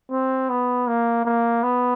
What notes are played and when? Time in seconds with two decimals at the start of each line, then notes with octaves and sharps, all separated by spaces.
0.11 C4
0.49 B3
0.88 A#3
1.25 A#3
1.63 B3